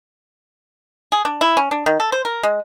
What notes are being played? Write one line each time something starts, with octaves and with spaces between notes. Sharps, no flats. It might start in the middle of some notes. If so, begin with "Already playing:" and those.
G#4
D4
E4
C#4
D4
D#3
A4
C5
A#4
G#3